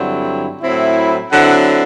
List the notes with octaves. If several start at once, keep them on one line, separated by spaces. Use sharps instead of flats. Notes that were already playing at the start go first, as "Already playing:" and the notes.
Already playing: G2 D3 F#3 C4 E4
A2 F#3 C4 E4
B5
D3 F#3 C4 E4 F#5